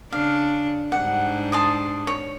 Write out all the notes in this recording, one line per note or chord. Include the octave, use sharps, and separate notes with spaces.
C#3 D4 F5
G#2 G3 D4 F#5
A5 C6 D#6
C#5